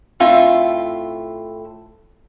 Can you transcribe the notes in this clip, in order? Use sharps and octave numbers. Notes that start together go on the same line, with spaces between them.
A2 C4 F4 E5